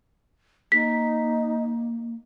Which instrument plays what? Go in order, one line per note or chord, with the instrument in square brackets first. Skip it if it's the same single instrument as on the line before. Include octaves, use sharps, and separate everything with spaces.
[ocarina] A#3 [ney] D#4 [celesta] B6